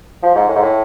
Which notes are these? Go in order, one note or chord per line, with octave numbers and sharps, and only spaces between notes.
F3
G#2
A2
G#2
A2